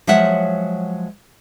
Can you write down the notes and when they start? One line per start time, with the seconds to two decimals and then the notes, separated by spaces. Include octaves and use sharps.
0.07 F3 F#3 G#3 C#5 E5 F#5